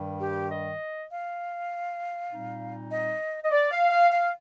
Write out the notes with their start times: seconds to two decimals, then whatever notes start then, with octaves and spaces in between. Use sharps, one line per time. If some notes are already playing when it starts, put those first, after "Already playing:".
Already playing: G2 D#3 G3
0.20 G4
0.51 D#5
1.10 F5
2.31 A#2 G3 C4 D#4
2.91 D#5
3.44 D#5
3.51 D5
3.71 F5
3.91 F5
4.11 F5